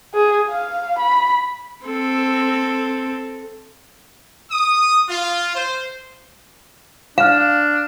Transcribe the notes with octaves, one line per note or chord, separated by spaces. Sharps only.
G#4
F5
B5
C4 A4
D#6
F4
C5
D4 F5 F6 E7